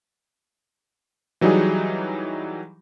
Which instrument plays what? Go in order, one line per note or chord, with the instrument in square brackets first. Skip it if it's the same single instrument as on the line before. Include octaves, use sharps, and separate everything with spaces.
[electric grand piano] E3 F#3 G3 D#4 F#4 G#4